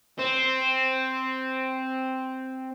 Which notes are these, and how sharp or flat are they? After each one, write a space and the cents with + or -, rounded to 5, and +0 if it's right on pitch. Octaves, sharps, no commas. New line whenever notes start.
C4 +0 C5 +0